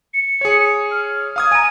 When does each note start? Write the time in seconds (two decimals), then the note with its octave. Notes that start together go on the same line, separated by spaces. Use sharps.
0.14 C#7
0.41 G#4 C#5
0.91 F6
1.36 F5 D#6 G#6
1.51 G#5 A#5 D#7